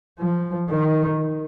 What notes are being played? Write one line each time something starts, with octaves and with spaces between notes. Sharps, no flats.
F3
D#3